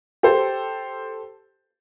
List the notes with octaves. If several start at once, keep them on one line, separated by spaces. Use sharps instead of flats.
G4 A4 C5